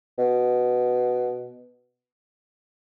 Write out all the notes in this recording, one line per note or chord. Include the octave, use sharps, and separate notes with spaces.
B2